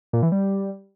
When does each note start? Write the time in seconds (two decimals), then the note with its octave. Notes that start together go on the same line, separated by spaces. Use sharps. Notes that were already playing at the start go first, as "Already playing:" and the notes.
0.13 A#2
0.23 E3
0.32 G3